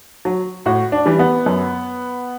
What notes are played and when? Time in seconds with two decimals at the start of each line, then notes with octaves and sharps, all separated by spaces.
0.25 F#3
0.66 A2 F#4
0.92 D4
1.06 E3 G3
1.19 B3
1.46 F#2